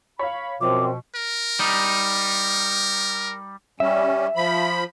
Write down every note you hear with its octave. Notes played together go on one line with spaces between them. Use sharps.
C#5 F5 B5
F#2 B2 F3 C4 D6
A#4
G3 D#4
G3 C#4 E5
F3 B5